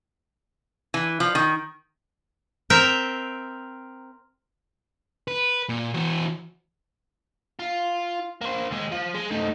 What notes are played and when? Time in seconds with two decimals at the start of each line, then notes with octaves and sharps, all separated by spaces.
0.94 E3
1.20 F3
1.35 D#3
2.70 C4 A#4 E5 G5 A#5
5.28 B4
5.69 A#2
5.94 E3 F#4
7.60 F4
8.41 A#3 C5
8.71 D#2 G#3
8.92 F3
9.14 G#3
9.31 A3 D#4